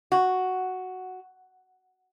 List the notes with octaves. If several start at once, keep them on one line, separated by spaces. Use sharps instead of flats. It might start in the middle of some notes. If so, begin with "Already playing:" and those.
F#4